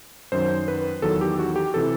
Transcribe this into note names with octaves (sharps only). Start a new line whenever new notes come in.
F#2 D#3 F#3 C5
B4
E2 D#3 F#3 A4
G4
F#4
G4
C3 E3 A4